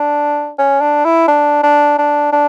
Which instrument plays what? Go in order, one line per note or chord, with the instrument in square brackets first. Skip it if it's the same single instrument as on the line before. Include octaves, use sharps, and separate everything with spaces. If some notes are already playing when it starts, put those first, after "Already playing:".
Already playing: [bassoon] D4
C#4
D4
E4
D4
D4
D4
D4